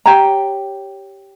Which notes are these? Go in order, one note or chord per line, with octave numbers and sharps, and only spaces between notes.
G4 C#5 G5 A#5